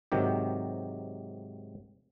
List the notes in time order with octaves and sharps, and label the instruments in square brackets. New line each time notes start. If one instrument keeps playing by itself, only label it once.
[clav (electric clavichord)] G#2 C3 D#3 F#3 G4